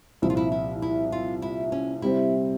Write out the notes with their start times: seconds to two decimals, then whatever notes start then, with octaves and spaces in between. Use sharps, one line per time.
0.22 C2 A#2 F3 E4
0.30 F4
0.37 E4
0.52 E4
0.82 E4
1.12 F4
1.42 E4
1.72 C#4
2.02 C3 G3 C4 E4